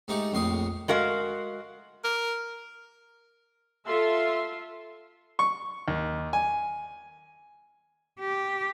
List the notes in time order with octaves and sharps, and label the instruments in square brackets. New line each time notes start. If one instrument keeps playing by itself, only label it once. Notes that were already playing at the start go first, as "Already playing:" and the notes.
[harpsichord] G#2 A3 D#4 G4 C#6
A#1 F2 A2 C6 C#6 D#6
[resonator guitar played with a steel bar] G#3 F#4 A#4 F5
[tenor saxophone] A#4
[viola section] F4 A4 E5 C6
[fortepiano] C#6
D#2
G#5
[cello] G4